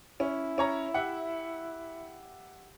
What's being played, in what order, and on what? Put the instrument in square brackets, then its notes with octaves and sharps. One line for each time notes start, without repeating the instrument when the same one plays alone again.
[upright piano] C#4 [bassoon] E4
[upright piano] C#4 C#5 A#5
G4 E5 F#5